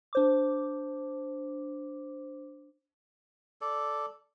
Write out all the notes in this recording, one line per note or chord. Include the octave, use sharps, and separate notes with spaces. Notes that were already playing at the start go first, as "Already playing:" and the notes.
D4 C5 D6
A4 D5